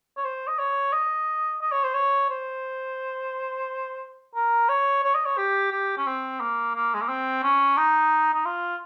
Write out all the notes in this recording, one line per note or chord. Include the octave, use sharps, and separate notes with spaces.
C#5
C5
D#5
C#5
D#5
D#5
C#5
C5
C#5
C5
A#4
C#5
C#5
D#5
C#5
G4
G4
C#4
C4
A#3
A#3
G#3
A#3
C4
C#4
D#4
D#4
F4